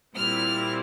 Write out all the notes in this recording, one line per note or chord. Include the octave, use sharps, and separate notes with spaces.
A#2 G3 C4 E4 F6